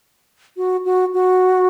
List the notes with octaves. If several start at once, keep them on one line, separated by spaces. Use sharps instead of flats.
F#4
F#4
F#4